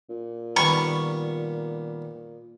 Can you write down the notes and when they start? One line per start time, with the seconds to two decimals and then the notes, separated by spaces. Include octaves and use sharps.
0.09 A#2
0.56 D#3 G3 B3 B5 C#6